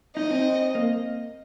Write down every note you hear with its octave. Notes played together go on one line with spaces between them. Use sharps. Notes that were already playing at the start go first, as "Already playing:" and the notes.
D#4 D#5
C4
A#3